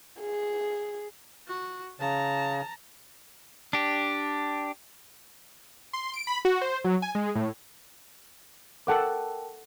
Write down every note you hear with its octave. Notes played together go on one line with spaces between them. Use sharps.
G#4
F#4
C#3 A5 A#5
D4 G4
C6
D7
B5
F#4
C5
F#3
G#5
G#3
A2
A4 A#4 F#5 G5 A5 D6